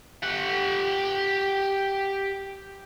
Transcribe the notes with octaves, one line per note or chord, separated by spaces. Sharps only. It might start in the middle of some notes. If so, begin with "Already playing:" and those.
G4 F#5